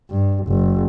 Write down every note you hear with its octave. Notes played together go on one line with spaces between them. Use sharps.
G2
F#1